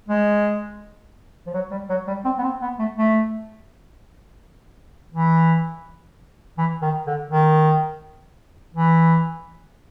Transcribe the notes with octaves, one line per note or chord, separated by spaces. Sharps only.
G#3
F3
F#3
G3
F#3
G3
C4
B3
C4
B3
A3
A3
E3
E3
D#3
D3
D#3
E3